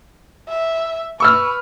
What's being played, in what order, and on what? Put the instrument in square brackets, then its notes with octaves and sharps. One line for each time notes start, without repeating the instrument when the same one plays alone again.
[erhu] E5
[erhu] B4 [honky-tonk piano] C#6 E6 F6